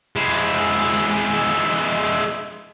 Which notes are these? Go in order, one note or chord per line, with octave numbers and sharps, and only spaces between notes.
G#3 E4